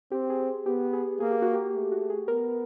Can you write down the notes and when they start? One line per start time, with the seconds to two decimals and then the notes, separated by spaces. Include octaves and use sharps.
0.12 C4 G4
0.30 G#4
0.39 G4
0.66 B3 G4
0.93 G#4
1.20 A#3 G#4
1.31 G4
1.42 F#4
1.54 G4
1.75 A3
1.92 F#4
2.10 G#4
2.28 B3 A#4